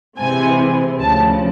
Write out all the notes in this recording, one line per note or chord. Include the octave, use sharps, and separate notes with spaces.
C3 E3 G#3 C4 G#5
D2 C#3 F3 A5